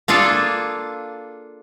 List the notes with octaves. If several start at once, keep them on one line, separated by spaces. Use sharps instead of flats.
A#3 D4 F4 G#4 A4